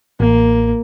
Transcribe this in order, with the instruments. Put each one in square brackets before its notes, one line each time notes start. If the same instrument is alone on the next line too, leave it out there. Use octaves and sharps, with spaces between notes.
[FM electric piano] A1 [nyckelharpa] A#3